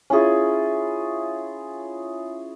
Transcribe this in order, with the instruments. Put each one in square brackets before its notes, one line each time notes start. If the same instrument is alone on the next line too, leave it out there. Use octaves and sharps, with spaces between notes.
[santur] C#4 E4 F4 G#4